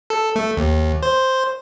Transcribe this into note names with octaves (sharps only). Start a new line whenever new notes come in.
A4
A3
D#2
C5